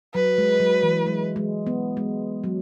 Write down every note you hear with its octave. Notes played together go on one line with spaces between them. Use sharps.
F#3 B4
G#3
F#3
E3
G#3
G#3
B3
G#3
F#3